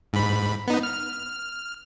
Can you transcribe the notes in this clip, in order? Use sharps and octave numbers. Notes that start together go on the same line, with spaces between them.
G#2 B5
B3 D#4
F6